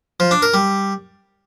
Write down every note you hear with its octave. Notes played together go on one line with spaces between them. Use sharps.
F3
D4
A#4
G3